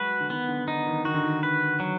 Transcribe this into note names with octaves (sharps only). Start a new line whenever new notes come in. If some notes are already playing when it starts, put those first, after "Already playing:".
Already playing: F#3 G#3 F#4 B4
D3
D#3 B3
D3
D3 D#4
D#3
D#3 F#4
D3
D#3
B4
F#3